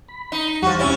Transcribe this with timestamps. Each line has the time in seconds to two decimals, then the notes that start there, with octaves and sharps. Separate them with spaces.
0.08 B5
0.32 D#4
0.62 E2 F3 G3 F#4
0.79 C3 C#4 E4